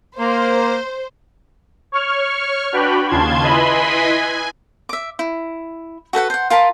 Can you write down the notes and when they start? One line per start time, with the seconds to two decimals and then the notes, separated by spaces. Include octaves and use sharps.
0.19 A#3 C5
1.92 C#5 C#6 F6
2.72 D4 F#4 B4 G5 B5
3.09 D#2 C#3 F4 A5 C6 G#6
3.43 E4 B4 D#5 G#5 B5 C6
4.11 G#5
4.89 E5 D6
5.19 E4
6.13 F#4 A4 B4 F#5
6.30 C5 F#5
6.50 F4 A#4 A5 B5